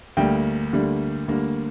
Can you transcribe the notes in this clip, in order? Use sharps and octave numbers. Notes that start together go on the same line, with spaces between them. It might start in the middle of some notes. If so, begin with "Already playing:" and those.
D2 D3 G3 A#3 G5
D2 D3 G3 A#3
D2 D3 G3 A#3